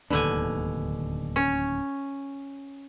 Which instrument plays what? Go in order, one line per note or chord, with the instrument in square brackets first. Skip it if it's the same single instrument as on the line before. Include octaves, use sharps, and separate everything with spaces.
[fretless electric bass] D1 D#2 D4 [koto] B2 D3 G#5
[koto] C#4